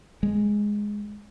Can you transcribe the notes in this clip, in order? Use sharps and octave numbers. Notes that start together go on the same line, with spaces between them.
G#3